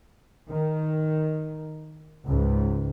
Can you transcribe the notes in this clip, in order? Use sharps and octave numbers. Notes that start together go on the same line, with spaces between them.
D#3
C#2 G#2